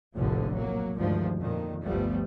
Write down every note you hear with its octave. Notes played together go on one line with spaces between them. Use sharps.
F1 A#1 F2 A2 D3 F3
F#3 A#3
D2 G2 D#3 F3 G#3
F2 A#2 D#3
G1 D2 F3 G3 A3 B3